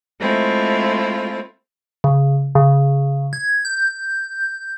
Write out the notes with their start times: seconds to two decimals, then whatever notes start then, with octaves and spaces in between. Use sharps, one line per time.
0.19 G#3 A3 C4 E4 F4
2.04 C#3
2.55 C#3
3.33 G#6
3.65 G6